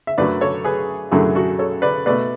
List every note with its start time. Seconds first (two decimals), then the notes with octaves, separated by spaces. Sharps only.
0.07 E5
0.18 F#2 D3 F#3 A3 B4 D5
0.41 A4 C#5
0.64 G#4 B4
1.11 F#2 D3 F#3 A3 E4 G#4
1.35 F#4 A4
1.59 A4 C#5
1.82 B4 D5
2.06 B2 A3 B4 D5